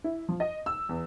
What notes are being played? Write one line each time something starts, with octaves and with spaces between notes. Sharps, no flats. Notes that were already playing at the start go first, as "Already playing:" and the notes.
E4
F3
D#5
E6
E2